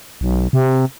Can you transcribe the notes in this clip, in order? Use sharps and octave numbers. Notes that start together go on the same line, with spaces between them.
B1
C3